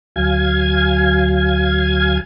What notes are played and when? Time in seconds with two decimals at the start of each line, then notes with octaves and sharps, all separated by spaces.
0.16 D2 F#3 F5 G#5 G#6